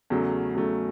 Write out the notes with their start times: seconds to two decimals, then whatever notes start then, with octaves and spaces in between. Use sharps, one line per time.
0.10 E2 C#3 F#3 A3
0.55 E2 C#3 F#3 A3